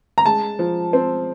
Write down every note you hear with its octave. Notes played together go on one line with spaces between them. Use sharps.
A#5
G#3 A5
F3
C4